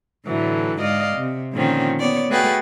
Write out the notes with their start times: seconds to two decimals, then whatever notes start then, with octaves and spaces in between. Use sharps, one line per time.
0.25 A2 D3 E3 F#3 A3
0.79 G#2 D5 D#5 F5
1.16 C3
1.53 A#2 D3 D#3 F3 C4 C#4
1.99 B3 C#5 D5
2.29 A3 F#4 G#4 B4 G5 A6